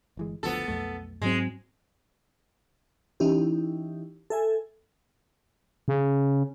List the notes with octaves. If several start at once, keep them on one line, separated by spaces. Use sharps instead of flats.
G1 E3 G#3
F#1 D2 F3 B3 A4
B1 F2 A3
G#2 F#3 G#3 C4
E3 C#4 D#4 E4 G4
A4 E5 G#5
C#3